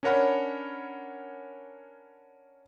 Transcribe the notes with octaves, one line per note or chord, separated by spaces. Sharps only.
C#4 D4 A#4 C#5 F#5 B5